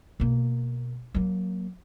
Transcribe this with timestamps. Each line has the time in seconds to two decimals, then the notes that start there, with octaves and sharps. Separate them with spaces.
0.20 B2 A#3
1.15 F#3 A#3